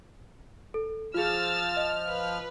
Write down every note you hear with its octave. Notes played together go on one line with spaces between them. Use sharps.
A4
F3 F4 G#4 E6 F6 A6
D#5
B4